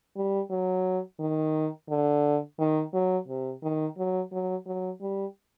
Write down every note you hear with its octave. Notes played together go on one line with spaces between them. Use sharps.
G3
F#3
D#3
D3
D#3
F#3
C3
D#3
F#3
F#3
F#3
G3